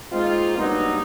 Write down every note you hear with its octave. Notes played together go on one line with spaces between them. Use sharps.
G#3 A#3 C4 D#4 F4
G2 F#3 A#3 B3 D#4